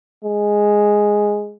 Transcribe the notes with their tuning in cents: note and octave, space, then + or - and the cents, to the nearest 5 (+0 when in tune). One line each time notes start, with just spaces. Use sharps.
G#3 -5